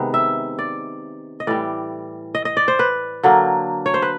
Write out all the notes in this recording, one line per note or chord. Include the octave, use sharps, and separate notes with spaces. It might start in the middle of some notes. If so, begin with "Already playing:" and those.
Already playing: C3 D#3 G#3 B3
E5
D5
D#5
A2 E3 G3 D5
D#5
D#5
D5
C5
B4
D3 F#3 A#3
C#5
C5
B4